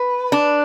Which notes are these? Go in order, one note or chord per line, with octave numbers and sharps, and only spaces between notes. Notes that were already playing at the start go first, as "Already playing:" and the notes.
Already playing: B4
D4